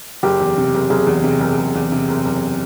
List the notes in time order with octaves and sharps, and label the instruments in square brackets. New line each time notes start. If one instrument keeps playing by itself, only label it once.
[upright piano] F#1 [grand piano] G4
[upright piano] E2
C3
F#1
[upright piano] F#1 [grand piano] G#4
[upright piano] E2
C3
F#1
F#1
E2
C3
F#1
F#1